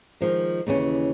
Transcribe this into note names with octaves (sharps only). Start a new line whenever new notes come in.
D#3 F3 G#3
D#2 C#3 E3 C#4